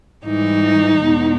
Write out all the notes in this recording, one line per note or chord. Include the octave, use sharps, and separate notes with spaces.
G#2 E3 G3 D#4
E2 B2 G#3